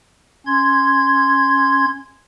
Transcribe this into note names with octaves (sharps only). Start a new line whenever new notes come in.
C#4 C6 G#6